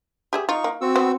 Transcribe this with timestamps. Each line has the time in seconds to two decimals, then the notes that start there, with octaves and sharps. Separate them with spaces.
0.33 G4 G#4 E5
0.49 D#4 F4 C#6
0.64 A#3
0.81 C4 F#4 E6
0.96 B3 C5